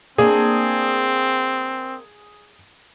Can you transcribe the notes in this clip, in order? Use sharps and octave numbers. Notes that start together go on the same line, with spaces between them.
A#3 C4 D4 G#4